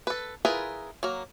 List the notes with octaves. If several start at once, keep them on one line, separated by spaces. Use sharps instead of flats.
A4 B4
E4 F4 G#4 A#4 B4
F#3 A#3